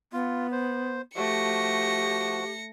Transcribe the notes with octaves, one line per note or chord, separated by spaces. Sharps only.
B3 F4
C5
F3 A3 F#4 G4 A#6 C#7